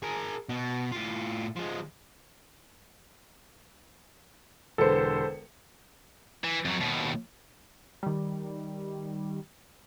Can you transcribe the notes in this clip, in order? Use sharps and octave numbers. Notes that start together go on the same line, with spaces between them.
G#4 A#4
B2
A2 F4
F3 G#3
E1 D3 A4 B4 C5 C#7
E3
F2 F#3
D#2 B2
D#3 G3